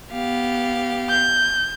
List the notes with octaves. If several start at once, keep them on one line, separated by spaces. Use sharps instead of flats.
B3 G4 F5
G6